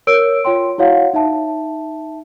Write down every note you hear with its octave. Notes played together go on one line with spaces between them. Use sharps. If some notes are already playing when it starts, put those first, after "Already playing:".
A#4 C#5 E6 D7
F4 C#5 G5 C6
E4 F#4 C#5 F5 F#5
D#4 E5 A5